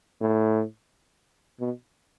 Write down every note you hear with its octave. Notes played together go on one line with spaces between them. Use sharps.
A2
B2